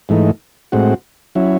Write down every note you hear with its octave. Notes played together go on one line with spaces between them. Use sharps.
G#2 E3 A3 D#4
A2 G#3 C4 F#4
F#3 C#4 E4